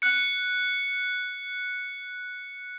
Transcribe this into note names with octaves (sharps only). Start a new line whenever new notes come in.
F#6 C#7